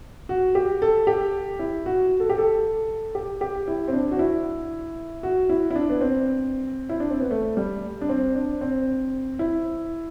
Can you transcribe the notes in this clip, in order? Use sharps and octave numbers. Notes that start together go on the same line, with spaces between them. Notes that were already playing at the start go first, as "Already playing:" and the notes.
F#4
G4
A4
G4
E4
F#4
A4
G4
A4
G4
G4
E4
C4
D4
F#4
E4
F#4
E4
E4
D4
B3
C4
E4
D4
C4
B3
A3
G3
D4
C4
D4
C4
E4